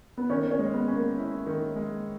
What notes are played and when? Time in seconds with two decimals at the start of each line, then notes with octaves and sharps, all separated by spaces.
0.17 B3
0.29 D#3 C#4
0.51 C#4
0.59 G#3
0.73 B3
0.88 C#4
0.95 A#3
1.17 E4
1.47 D#3
1.76 G#3